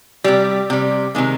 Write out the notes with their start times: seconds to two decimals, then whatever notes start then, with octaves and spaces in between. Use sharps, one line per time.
0.24 C3 G3
0.70 C3 G3
1.15 C3 D#3 G#3